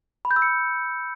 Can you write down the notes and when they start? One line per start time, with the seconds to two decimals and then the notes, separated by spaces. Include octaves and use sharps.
0.25 B5
0.31 G6
0.36 E6
0.42 C#7
0.48 E6